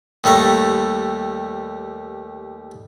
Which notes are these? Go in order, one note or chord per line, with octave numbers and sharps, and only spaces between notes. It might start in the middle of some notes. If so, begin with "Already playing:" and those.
D#2 G3 A3 A#5